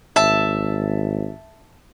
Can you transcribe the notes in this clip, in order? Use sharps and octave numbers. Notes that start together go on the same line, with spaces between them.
G#1 E5 A5